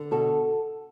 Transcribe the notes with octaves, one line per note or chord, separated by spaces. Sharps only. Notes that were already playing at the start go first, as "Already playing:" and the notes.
Already playing: D3
B2 F#4 A4